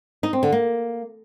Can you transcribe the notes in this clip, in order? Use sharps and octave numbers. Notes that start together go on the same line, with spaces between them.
D#4
C4
D3
A#3